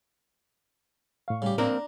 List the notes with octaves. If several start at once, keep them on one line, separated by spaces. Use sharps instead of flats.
A2 F5 C#6
C#3 G3 G4
A#3 C4 D4 A#4 A#5